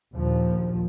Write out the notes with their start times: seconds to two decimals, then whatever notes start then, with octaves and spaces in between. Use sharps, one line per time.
0.14 A#1 D#2 F3